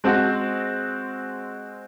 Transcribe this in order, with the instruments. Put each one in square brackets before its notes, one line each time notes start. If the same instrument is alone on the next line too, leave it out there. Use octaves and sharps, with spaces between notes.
[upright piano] G#3 C4 F#4